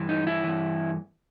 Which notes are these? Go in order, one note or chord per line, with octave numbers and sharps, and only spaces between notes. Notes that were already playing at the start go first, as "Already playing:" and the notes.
Already playing: G2 E3
D#4
E4
G2 E3